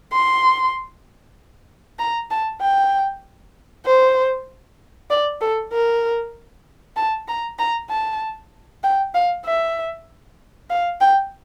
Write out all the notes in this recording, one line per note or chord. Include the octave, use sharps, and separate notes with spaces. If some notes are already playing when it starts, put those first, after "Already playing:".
C6
A#5
A5
G5
C5
D5
A4
A#4
A5
A#5
A#5
A5
G5
F5
E5
F5
G5